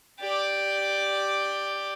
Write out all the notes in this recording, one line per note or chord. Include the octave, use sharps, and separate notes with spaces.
G4 D5